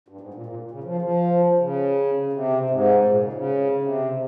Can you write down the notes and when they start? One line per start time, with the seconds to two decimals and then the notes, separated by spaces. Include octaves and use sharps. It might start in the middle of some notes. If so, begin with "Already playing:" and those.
0.08 G2
0.21 G#2
0.34 A#2
0.46 A#2
0.71 C#3
0.84 F3
1.02 F3
1.58 C#3
2.33 C3
2.70 G#2
3.08 A#2
3.20 C#3
3.33 C#3
3.82 C3